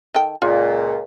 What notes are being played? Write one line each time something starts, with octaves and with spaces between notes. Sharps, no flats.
D#3 A4 G5
C#2 A#2 F4